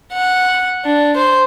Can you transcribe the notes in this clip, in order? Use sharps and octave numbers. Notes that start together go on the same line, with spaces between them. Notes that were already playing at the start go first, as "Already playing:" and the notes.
F#5
D4
C5